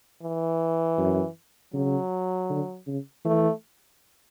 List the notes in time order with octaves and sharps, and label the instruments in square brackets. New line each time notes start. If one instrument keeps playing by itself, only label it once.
[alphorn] E3
[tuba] F#2
[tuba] C#3 [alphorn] F#3
[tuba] D3
C#3
[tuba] E3 [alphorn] A3